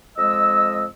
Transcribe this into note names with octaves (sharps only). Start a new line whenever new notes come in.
F2 G#3 D#5 E6